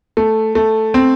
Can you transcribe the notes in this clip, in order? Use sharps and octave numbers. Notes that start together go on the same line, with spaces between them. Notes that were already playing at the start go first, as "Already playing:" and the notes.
A3
A3
C4